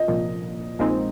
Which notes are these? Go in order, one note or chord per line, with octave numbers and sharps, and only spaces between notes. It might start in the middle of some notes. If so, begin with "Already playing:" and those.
Already playing: D#5
C2 A#2 F3
A#1 A#2 G#3 C4 D#4